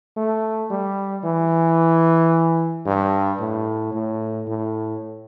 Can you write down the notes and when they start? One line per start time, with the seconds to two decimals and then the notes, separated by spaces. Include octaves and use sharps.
0.17 A3
0.70 G3
1.24 E3
2.86 G2
3.40 A2
3.93 A2
4.47 A2